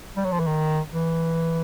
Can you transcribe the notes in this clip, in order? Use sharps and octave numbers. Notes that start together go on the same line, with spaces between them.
G3
F#3
F3
E3
D#3
E3